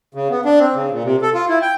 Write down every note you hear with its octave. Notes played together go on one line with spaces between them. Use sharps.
C#3
B3
D4
C4
C#3
A#2
C3
A4
F4
E4
G5